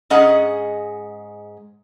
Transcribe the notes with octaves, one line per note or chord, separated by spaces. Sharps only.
G#2 G#3 C#4 G#4 D#5 F#5